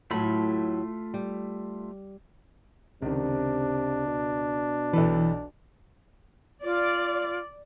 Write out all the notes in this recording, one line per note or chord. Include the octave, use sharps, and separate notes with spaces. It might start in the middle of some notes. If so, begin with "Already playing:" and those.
A2 F#3 A3 F4 B5
G3
C#2 C3 D#3 D4
B2
B1 E3 A4 B4
F4 D5